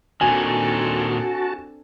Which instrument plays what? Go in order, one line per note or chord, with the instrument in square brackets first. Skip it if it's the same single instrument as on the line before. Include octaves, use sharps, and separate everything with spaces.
[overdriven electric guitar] A#2 D#3 [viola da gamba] C4 D4 A4 [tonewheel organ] F#4 A5 [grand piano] G#5